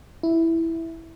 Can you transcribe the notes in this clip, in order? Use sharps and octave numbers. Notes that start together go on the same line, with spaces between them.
E4